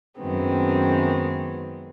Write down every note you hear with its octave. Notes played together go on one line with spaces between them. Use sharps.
F#2 D#3 G#3 B3 C4